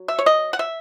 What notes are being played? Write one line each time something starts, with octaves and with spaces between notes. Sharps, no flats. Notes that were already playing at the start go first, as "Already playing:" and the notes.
Already playing: F#3
E5
C#5
D#5
F#5
E5